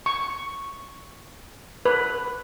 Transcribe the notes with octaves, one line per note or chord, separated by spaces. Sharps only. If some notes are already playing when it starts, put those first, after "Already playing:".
C#6
B4